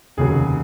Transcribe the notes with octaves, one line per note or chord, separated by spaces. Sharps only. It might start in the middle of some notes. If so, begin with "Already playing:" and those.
F1 D#2 C#3 F#3 G#4